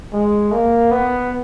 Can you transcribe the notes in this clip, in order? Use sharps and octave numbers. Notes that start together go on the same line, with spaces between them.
G#3
A#3
B3